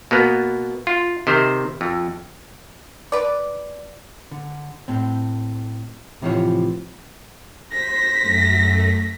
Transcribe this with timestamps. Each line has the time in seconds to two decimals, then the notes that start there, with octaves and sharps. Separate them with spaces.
0.11 B2 A#3 B3
0.87 F4
1.27 C3 D#3 C5
1.81 F2
3.12 B4 D5
4.31 D3
4.88 A2 C4
6.22 A2 C3 E3 F3 C5 C#5
7.72 C5 A#6 B6
8.22 F#2 A3